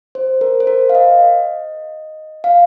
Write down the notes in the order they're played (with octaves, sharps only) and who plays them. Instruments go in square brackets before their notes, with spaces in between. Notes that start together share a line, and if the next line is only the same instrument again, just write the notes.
[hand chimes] C5
A#4
C5
A#4
F5
D#5
F5